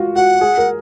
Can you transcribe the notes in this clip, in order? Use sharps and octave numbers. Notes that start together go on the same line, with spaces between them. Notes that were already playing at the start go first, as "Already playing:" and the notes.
Already playing: F4 F#4
F#4 F#5
G#4
A#4